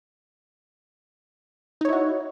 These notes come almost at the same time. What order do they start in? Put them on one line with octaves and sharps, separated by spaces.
D#4 C#5 E4 F#4